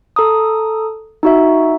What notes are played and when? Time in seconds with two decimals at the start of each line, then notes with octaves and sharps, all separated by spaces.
0.16 A4 A#5 D#6
1.23 D#4 F#4 E5